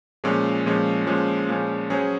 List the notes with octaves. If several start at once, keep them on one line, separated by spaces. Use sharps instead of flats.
A#2 F3 G#3 C#4
A#2 F3 G#3 C#4
A#2 F3 G#3 C#4
A#2 F3 G#3 C#4
F#3 C#4 G#4 C5